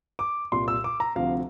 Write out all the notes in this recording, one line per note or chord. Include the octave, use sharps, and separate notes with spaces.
D6
C2 A#2 G3 C6
E6
D6
A#5
D2 C3 F3 F5